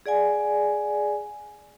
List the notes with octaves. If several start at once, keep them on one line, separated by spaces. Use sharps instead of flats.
G#4 D5 F#5 G#5